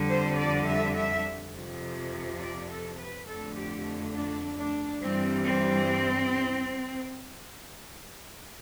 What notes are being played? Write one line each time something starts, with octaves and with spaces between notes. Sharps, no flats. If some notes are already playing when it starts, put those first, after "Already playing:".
Already playing: F2 D3 G3
C5
D5
E5
E5
F2 C3 F3
D5
A4
B4
F2 D3 A3 A4
G4
D4
D4
G2 E3 G3 C4
C4